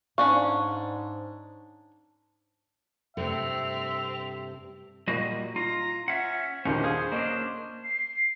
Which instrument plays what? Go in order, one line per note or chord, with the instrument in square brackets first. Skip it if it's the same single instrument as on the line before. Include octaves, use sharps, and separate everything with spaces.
[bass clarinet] G#2 [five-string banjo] C#4 D4 F5 [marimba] C#6
[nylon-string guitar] G2 C3 A3 [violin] C4 F7 [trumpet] E5
[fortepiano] A#2 [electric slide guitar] G3 F#4 D#5
[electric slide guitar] F4 [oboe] A#5
[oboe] C#4 [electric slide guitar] E5 F#5
[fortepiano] D#2 A#2 D3 [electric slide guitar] C#4 [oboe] C5
[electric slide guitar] G#4 [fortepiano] F5
[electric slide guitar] A#3 C#4 D4 [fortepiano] D#5
[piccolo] C7